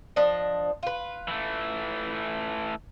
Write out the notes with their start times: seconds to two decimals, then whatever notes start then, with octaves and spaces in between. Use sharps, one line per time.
0.16 F3 D4 D#5
0.83 F4 B4
1.28 E3 A3